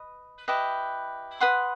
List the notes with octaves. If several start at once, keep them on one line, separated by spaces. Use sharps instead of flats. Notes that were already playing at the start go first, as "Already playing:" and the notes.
Already playing: B4 D#5
E4 G4 B4 D#5
B4 F#5 C6 D#6